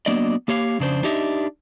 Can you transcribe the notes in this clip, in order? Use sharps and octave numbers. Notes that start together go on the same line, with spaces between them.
F#3 A#3 B3 D4 D5 D#5
A#3 G4 C#5 F5
F2 C#3 D4 C5
D4 D#4 G4 D#5 E5